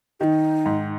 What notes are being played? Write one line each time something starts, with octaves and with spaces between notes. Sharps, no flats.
D#3 D#4 G4
G#2